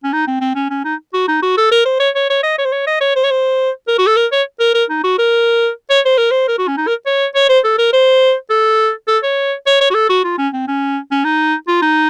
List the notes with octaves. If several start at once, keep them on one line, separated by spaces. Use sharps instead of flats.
C#4
D#4
C4
C4
C#4
C#4
D#4
F#4
D#4
F#4
A4
A#4
C5
C#5
C#5
C#5
D#5
C#5
C5
C#5
D#5
C#5
C5
C#5
C5
A#4
F#4
A4
A#4
C#5
A#4
A#4
D#4
F#4
A#4
C#5
C5
A#4
C5
A#4
F#4
C#4
D#4
A#4
C#5
C#5
C5
A4
A#4
C5
A4
A4
C#5
C#5
C#5
F#4
A4
F#4
F4
C#4
C4
C#4
C#4
D#4
F4
D#4